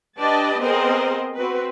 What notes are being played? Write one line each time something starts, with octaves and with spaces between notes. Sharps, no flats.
D4 G4 B4 D5 D#5 A5
B3 C4 G#4 A#4 C5 D#5
C4 F#4 B4